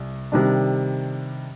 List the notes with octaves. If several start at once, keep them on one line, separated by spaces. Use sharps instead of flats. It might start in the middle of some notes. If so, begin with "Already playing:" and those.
Already playing: C2 C3
C3 D#3 G3 D4